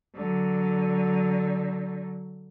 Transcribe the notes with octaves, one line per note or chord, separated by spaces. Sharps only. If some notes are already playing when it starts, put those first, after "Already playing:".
D3 F#3